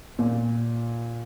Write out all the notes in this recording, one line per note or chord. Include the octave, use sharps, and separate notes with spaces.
A#2